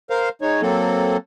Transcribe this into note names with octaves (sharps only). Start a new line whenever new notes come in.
A#4 C5 F5
G#3 D#4 C#5
F#3 A#3 C4 A4